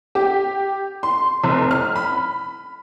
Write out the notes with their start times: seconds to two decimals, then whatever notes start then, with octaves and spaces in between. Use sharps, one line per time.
0.15 G4
1.03 C6
1.43 F1
1.71 F6
1.96 B5